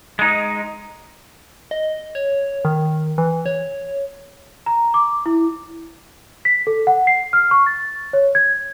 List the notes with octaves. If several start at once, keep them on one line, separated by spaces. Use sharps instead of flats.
G#3 D#4
D#5
C#5
D#3
E3
C#5
A#5
D6
E4
B6
A4
F#5
C7
F6
C#6
A6
C#5
G#6